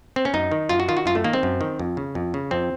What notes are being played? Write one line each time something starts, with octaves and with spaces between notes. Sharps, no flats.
C4
C#4
F#2 D#4
D#3
F#2 F4
F#4
D#3 F4
F#4
F#2 F4
A3
D#3 A#3
C4
F#2
D#3
F2
C#3
F2
C#3
F2 C4